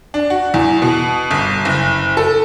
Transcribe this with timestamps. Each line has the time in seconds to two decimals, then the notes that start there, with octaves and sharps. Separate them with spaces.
0.14 D4
0.30 F#4
0.54 E2
0.82 B2
1.31 G1
1.65 F#1
2.17 A4